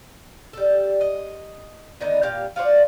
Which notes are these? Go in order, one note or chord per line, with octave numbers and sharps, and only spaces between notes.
G3 A4
D#5
D3 D#3 B3 D#4
A#2 G4 F5
F4 F#4 C5 D5